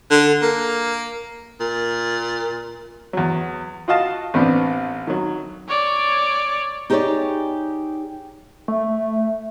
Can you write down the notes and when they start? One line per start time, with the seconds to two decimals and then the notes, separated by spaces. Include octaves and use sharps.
0.11 D3
0.42 A#3
1.60 A#2
3.13 E2 F#3
3.88 F4 F#4 D#5 F5 A5
4.34 A1 B3 C4 D4
5.07 D#3 F#3
5.69 C#5 D5
6.90 D#4 G4 G#4 B4 C#5 D5
8.68 A3